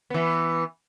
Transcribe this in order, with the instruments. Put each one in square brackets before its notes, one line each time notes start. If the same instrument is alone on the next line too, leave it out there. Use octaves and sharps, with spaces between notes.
[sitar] E3 B3